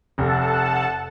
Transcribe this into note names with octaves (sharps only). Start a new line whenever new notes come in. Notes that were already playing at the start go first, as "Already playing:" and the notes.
F1 A4 F#5 A5